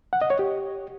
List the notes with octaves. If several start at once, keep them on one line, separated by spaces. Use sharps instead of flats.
F#5
D#5
C#5
G4